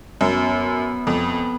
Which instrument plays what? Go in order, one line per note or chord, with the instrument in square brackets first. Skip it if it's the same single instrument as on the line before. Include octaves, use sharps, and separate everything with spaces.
[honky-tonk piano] F#2 [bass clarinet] B3
[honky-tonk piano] F2